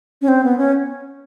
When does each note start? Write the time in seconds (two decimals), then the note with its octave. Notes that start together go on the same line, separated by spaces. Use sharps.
0.22 C#4
0.28 C4
0.44 B3
0.58 C#4